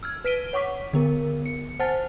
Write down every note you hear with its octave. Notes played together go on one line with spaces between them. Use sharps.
E6 F6 G#6
B4 F6 B6 D7 D#7 G7
C#5 F#5 C#6 D6 B6
D3 B3 A#4
C#7
C5 F#5 G#5 A5 F6 A6